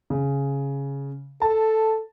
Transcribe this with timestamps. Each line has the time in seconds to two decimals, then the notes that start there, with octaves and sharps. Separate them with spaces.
0.10 C#3
1.42 A4 A5